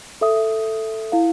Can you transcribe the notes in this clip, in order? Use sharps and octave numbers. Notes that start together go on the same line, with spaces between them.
A4 E5 D#6
E4 F5